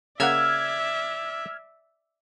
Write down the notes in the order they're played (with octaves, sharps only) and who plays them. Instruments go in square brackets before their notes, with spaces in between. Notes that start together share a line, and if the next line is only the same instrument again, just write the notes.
[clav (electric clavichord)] C#3 A#3 F#5 [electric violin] D5 E5 [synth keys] E6 F6 G#6